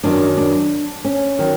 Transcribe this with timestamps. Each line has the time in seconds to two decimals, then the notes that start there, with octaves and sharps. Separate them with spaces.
0.04 F#2 D#3 F#3 D4
0.37 D4
1.05 C#4
1.39 D#3 F#3